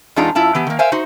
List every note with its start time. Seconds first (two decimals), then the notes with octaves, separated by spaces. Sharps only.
0.16 E2 G#3 D4 D#4 F4 A#5
0.35 F#2 E4 F4 A5
0.55 E3 B3 G4
0.67 D#3 A#3
0.79 A#4 C5 E5 F5 G#5
0.92 D#4 F#4 C5